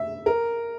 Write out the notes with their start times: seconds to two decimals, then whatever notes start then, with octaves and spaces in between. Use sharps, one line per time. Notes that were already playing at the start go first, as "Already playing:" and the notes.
Already playing: E5
0.26 A#4